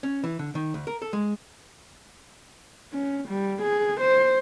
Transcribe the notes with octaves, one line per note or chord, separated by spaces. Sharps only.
C#4
E3
D3
D#3
D2
A#4
A4
G#3
C#4
G3
G#4
C5